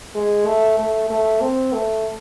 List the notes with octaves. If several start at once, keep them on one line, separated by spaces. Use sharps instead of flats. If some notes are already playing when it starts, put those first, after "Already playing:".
G#3
A3
A3
A3
C4
A3